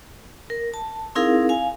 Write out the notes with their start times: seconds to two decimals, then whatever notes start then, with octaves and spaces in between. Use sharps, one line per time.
0.50 A#4
0.74 A5
1.15 C4 D#4 E4 G#4 A#4 F5
1.49 F5 G#5